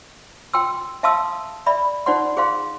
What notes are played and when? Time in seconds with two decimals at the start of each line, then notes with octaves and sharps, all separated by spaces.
0.54 G5 C6 E6
1.03 E5 F5 A5 C6 D#6 E6
1.66 D5 E5 B5
2.06 D#4 C5 D5 F#5 C6
2.37 G#4 C5 F5 C6